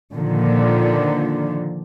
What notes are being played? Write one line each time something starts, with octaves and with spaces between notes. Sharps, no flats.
A#2 D3 D#3 F3